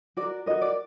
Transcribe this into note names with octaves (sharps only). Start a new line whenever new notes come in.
F#4 A#4 D5
F#4 A#4 D#5
D5